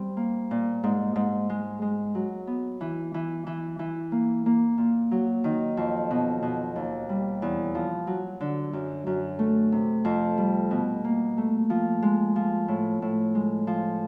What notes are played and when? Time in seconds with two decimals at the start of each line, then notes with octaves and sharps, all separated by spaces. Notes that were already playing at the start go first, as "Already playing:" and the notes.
Already playing: G3 C4
0.17 A#3
0.51 A#2
0.84 G#2
1.16 G#2
1.50 G#3
1.82 G#3
2.15 F#3
2.47 B3
2.81 E3
3.14 E3
3.47 E3
3.79 E3
4.12 A#3
4.46 A#3
4.78 A#2
5.11 F#3
5.44 D#3
5.77 F2
6.10 B2
6.42 B2
6.76 D#2
7.09 G3
7.42 E2
7.75 F3
8.07 F#3
8.41 D3
8.73 F#2
9.07 F#2
9.39 A3
9.72 C3
10.05 F2
10.38 G3
10.71 B2
11.04 A#3
11.38 A3
11.70 F3
12.02 G#3
12.36 F3
12.68 A2
13.02 A2
13.35 G#3
13.67 F3